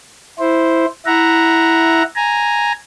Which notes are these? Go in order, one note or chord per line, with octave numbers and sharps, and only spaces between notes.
E4 C5
E4 E5 F#5 A#5
G#5 A#5